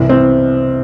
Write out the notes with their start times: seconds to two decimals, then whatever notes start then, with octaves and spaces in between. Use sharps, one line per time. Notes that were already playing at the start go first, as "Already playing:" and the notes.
Already playing: C2 C3 E3
0.09 C4